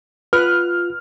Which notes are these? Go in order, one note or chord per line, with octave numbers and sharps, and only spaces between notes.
F4 B4 F6